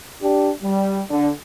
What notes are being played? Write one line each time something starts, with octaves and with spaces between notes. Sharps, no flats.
D4 G4
G3
D3